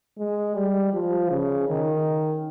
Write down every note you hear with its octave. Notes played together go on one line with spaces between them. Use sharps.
G#3
G3
F3
C#3
D#3